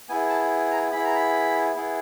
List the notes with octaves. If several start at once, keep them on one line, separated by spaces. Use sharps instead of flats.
B3 E4 G#4 G#5
A5
A#5
B3 E4 G#4 B5
A#5
B5
B3 E4 G#4